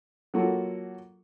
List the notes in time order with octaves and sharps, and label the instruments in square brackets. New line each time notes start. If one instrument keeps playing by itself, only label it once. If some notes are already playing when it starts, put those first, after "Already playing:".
[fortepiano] F#3 A#3 F4 F#4 A4